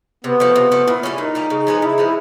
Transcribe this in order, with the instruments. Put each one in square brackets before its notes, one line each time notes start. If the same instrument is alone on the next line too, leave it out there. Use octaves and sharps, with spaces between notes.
[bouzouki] C3 [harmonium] B3
[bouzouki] F3 A3
C3
F3 A3
[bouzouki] A#2 [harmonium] E4
[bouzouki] G3 A#3 C#4 [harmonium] E4
[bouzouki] A#2 [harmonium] D#4
[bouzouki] G3 A#3 C#4
C#3
F3 G#3 B3
[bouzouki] C#3 [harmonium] E4
[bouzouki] F3 G#3 B3
[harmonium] E4